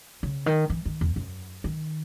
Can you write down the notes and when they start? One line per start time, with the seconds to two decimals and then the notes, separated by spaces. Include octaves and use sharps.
0.23 C#3
0.46 D#3
0.70 E3
0.85 D#3
1.01 E2
1.16 F#2
1.64 D#3